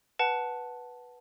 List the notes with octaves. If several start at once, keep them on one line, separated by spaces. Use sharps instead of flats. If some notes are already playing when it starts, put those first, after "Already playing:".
B4 F#5 A5